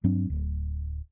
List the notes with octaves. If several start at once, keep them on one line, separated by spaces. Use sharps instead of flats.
G2 F#3 C4 D4
D1